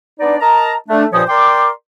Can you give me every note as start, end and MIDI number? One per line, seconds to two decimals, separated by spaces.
0.20 0.36 59
0.20 0.36 62
0.20 0.36 63
0.20 0.36 74
0.40 0.75 70
0.40 0.75 75
0.40 0.75 81
0.40 0.75 82
0.89 1.05 57
0.89 1.05 62
1.13 1.23 43
1.13 1.23 46
1.13 1.23 53
1.13 1.23 72
1.13 1.23 73
1.13 1.23 87
1.28 1.70 70
1.28 1.70 74
1.28 1.70 79
1.28 1.70 84
1.28 1.70 86